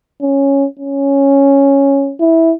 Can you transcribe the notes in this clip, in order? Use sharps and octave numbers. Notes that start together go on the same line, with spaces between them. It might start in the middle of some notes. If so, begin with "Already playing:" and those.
C#4
C#4
E4